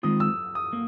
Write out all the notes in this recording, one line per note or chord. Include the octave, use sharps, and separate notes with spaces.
D#3 G#3 C4 F4 D#6
E6
D#6
A#3